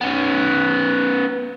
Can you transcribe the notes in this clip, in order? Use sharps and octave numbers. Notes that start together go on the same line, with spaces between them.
B3 C#4